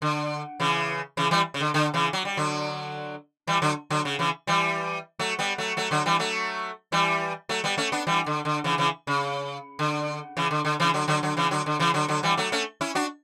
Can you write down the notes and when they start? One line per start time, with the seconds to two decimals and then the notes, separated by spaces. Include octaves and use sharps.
0.02 D3
0.60 C#3 E3
1.17 C#3 E3
1.31 E3 G3
1.54 C#3
1.61 D3
1.74 D3
1.94 C#3 E3
2.13 F#3
2.25 G3
2.37 D3 F#3
3.47 E3 G3
3.62 D3 F#3
3.90 D3 F#3
4.05 C#3
4.19 C#3 E3
4.47 E3 G3
5.19 F#3 A3
5.39 G3 B3
5.58 F#3 A3
5.77 F#3 A3
5.91 D3 F#3
6.06 E3 G3
6.19 F#3 A3
6.92 E3 G3
7.49 F#3 A3
7.64 G3 B3
7.78 A3 C#4
7.92 B3 D4
8.07 E3 G3
8.26 D3
8.45 D3
8.64 C#3 E3
8.78 C#3 E3
9.07 C#3
9.79 D3
10.37 C#3 E3
10.51 D3
10.65 D3
10.80 C#3 E3
10.94 D3 F#3
11.08 D3 F#3
11.23 D3 F#3
11.37 C#3 E3
11.51 D3 F#3
11.66 D3
11.79 C#3 E3
11.94 D3 F#3
12.08 D3 F#3
12.23 E3 G3
12.37 F#3 A3
12.52 A3 C#4
12.81 C#4 E4
12.95 D4 F#4